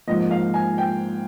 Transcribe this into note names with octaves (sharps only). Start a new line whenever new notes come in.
G#2 F3 A#3 D#5
F5
G#5
G5